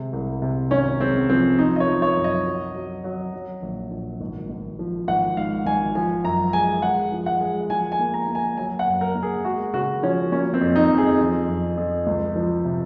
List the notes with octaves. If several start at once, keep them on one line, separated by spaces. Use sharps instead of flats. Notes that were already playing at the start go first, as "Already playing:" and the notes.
Already playing: C3 G#3
C2
C3
G#1 C#4
G#3 C4
F3 C4
F3 D#4
D#5
C#5
F3
C#5
F#2
D#5
F#3
F#3
F#3
F#3
A#1
A#1
G#1
G#1
F3
G#1 F#5
G#2 F5
G#1 G#5
F3 G#5
F#2 A#5
G#3 G#5
G#3 F#5
F3
F#5
G#3
F3 G#5
G#5
A#3
A#5
A#3
G#5
F#3 G#5
F#5
F#2
A#4
A#3
G#4
G#3 F#4
C#3 F#4
F3 C#4
A#3 C#4
C4
F2
D#4
F2
G#4
F3
F2
F2
C#2
F3
C3